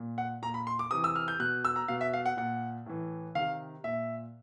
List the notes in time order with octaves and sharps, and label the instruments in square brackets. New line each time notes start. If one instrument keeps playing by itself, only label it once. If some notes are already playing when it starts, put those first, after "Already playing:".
Already playing: [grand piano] A#2
F#5
A#2 A#5
B5
C6
D6
C3 E3 D#6
E6
F6
G6
B2 F#6
E6
A#5
B2 F5
E5
F5
F#5
A#2 F#5
A2 E3
C3 D#3 F5
A#2 E5